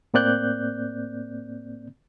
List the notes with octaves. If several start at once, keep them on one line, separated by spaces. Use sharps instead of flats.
A2 A#3 C4 D5 F#6 G6